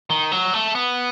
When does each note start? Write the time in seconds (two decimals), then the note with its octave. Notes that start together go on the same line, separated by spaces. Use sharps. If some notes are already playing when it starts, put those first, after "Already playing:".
0.10 D#3
0.32 F#3
0.53 A3
0.75 B3